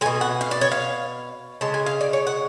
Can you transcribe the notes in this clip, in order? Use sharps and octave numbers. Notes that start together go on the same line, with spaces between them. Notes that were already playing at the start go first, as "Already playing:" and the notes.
G#3 G#5
B2
F#5
F5
D5
C#5
F5
C#3 G#3 A5
G#5
F5
D5
C#5
F#5